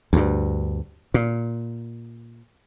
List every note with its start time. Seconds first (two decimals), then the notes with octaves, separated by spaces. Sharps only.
0.13 D2 G2
1.14 A#2